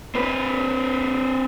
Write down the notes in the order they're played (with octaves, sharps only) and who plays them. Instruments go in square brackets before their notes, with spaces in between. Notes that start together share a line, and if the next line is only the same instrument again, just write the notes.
[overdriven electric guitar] C4 B4